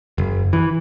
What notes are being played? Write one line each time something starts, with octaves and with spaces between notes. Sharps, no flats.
F#1
E3